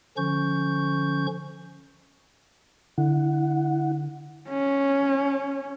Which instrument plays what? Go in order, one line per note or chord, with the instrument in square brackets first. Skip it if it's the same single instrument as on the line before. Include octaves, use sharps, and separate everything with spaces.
[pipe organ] D3 F3 C#4 C#6 G6
[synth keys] D3 [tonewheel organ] E4 F#5
[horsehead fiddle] C#4